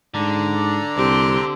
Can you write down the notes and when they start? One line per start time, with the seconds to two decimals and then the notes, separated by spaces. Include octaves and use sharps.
0.14 G#2 D3 D4 A#5
0.97 C2 C4 G4